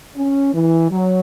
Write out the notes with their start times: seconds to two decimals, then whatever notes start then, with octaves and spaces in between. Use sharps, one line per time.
0.16 C#4
0.53 E3
0.90 F#3